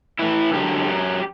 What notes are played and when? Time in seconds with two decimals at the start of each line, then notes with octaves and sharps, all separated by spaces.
0.19 A2 E3 E4
0.53 F#2 D3 F#3 G4
0.86 F#2 F#3